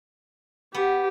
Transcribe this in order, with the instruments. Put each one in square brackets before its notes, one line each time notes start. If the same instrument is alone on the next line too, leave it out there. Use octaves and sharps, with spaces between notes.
[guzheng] B3 [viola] G4